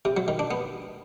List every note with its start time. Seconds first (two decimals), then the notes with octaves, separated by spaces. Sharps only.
0.05 C3
0.17 F#3
0.28 D#3
0.39 D4
0.51 B3